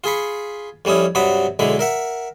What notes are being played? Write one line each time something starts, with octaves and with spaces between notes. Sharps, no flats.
F4 G#4 B5 C#6
F2 G3 C#4 E4 D#6
G2 C3 F#3 F#5 B5 D#6
B1 D3 G#3 E4 B5
A#4 E5 F#5